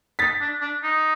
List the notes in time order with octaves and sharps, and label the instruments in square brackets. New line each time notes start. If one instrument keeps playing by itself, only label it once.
[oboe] D#4 [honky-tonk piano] A6 B6
[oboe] D4
D4
D#4